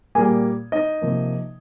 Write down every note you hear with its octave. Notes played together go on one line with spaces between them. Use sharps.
A#2 G3 A#3 G#4 G#5
D#4 D#5
C3 F3 A#3